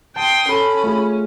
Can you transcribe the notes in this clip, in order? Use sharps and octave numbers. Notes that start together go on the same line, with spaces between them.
G5 A5 C6 D#6
C#4 A4 A5 B5
A3 F4 G#4